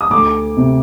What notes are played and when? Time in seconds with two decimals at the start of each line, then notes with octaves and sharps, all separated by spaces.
0.01 D#6
0.10 D2 D6
0.57 C3